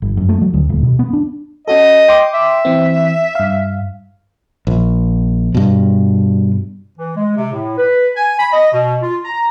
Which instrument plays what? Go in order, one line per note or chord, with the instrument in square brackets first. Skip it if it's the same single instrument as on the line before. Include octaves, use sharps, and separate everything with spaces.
[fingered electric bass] G1
F#2
A3
F#3
D2
D#1
B2
B3
D4
[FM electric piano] C#4 F#4 A4 [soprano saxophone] D#5
[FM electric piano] G5 C6 D6
[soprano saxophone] E5
[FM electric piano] E3 C4
G2 F5
[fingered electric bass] A#1
G2 B2
[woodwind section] E3
G#3
C3
A2
B4
G#5
B5
D#5
B2
F4
A#5